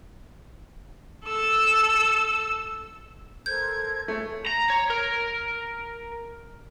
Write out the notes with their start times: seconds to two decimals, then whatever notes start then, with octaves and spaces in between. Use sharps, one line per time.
1.26 A4 E6
3.46 A4 A#4 C5 G6 G#6
4.08 A3 G#4 C#5
4.47 A#5
4.70 C#5
4.90 A#4